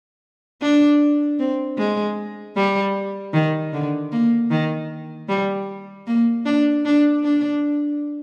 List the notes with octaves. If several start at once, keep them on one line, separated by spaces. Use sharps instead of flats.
D4
C4
G#3
G3
D#3
D3
A#3
D#3
G3
A#3
D4
D4
D4